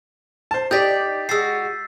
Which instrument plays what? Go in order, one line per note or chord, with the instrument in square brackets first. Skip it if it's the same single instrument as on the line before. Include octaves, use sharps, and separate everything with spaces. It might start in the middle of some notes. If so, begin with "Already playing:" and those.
[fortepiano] C5 A5
[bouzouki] D#4 D5 [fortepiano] G4 [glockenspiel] G6 A6 B6
[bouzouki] G#3 F#4 [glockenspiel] E6 A6 C7